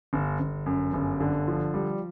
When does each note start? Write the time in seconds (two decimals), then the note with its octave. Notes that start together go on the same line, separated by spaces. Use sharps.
0.13 G1
0.40 G1
0.66 F#2
0.93 G1
1.20 D3
1.48 F3
1.74 G3